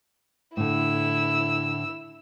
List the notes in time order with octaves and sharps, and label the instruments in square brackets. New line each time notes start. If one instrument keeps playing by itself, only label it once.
[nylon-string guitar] A2 D3 [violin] E4 E6